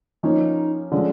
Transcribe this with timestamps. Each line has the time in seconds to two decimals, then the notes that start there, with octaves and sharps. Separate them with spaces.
0.23 F3 A#3 C#4 D#4
0.92 D3 F3 G#3 C#4